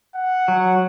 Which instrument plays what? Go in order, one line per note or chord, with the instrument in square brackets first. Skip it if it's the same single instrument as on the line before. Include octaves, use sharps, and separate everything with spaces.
[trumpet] F#5
[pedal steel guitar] F#3